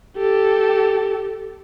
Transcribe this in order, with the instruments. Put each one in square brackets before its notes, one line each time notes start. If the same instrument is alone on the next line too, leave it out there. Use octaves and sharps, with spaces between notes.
[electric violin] G4 A4